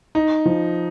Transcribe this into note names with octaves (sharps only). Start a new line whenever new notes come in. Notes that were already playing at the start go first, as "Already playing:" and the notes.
D#4
F3